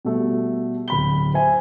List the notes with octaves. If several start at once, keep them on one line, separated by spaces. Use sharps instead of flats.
B2 G3 A3
D1 B5 G7
C5 E5 G#5